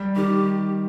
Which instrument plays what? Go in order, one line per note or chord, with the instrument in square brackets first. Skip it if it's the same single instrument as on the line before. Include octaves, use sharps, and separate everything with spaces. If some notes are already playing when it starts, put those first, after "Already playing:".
Already playing: [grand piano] G3
[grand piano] D#3 [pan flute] G4